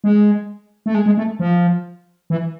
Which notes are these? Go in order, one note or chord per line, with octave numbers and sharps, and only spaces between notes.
G#3
A3
G#3
G#3
A3
F3
E3